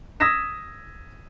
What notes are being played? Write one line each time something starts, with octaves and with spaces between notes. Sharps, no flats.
D#6 E6 G#6 A#6 B6 E7